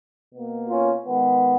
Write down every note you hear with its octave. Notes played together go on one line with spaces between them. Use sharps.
B2 A#3
C#4 F4
D#3 G#3 B3